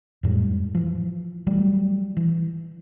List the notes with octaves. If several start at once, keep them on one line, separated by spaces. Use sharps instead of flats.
F2 A2 G3 G#3
E3 F3
E3 F#3 G3 A3
E3